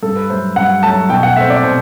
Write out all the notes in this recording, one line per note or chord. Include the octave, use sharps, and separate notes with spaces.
G2 A4
B4
F#3 A3 C5
G2 F#5
F#3 A3 A5
B2 G5
F#5
A3 C4 E5
D5
B2 C5